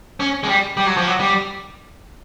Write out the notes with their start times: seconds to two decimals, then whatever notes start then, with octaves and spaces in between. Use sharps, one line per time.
0.20 C#4
0.43 G#3
0.49 G3
0.77 G3
0.87 F#3
0.97 F3
1.07 F#3
1.20 G3